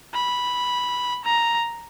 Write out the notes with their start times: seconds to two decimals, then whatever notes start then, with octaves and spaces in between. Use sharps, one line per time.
0.14 B5
1.24 A#5